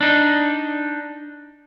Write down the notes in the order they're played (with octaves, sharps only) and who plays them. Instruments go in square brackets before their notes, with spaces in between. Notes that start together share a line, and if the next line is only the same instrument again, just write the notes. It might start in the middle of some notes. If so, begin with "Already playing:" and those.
[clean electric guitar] D4 D#4